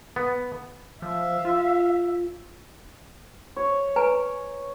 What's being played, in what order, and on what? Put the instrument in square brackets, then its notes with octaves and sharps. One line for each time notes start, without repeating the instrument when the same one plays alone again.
[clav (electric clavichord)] B3
[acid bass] F3 [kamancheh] E5 F5
[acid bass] F4
[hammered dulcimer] C#5
[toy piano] B4 G#5 A#5